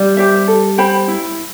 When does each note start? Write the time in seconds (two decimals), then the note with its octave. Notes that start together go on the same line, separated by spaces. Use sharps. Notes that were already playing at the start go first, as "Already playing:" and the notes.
Already playing: G3
0.17 G4 C5 E5
0.48 A4
0.78 C5 G5 B5
1.08 E4